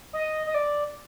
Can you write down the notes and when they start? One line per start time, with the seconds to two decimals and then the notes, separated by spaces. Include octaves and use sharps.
0.13 D#5
0.47 D#5
0.54 D5